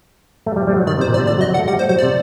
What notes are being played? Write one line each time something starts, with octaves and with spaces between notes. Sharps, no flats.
A3
G3
G3
F#3
D#3 D5
C3
C5
A#2
D5
C3
D3 D5
F#3
D#5
F#3
F#5
A3
G3 F#5
C5
F#3 C5
C3 D5